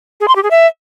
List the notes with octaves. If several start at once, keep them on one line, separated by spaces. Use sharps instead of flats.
G#4
C6
G4
G#4
E5